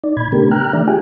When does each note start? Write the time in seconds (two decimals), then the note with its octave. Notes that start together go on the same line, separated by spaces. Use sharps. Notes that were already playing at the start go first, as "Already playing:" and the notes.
0.04 D#4 D5
0.17 A#2 B5 G#6
0.32 C#3 A3 B3 D4 G4 A#4
0.51 G5 A#5 F6 F#6
0.73 E3 A3 D4 D5 E5
0.88 F4 G4 G#4 G5 G#5